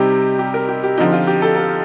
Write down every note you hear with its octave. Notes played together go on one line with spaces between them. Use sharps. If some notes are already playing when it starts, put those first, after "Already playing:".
Already playing: C3 G3 C4 D#4 G4
G4
A#4
G4
G4
D3 F3 C4 D#4 G4
F4
G4
A4
A4